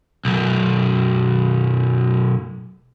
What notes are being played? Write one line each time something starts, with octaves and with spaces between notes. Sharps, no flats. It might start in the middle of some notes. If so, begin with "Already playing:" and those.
B1 F#2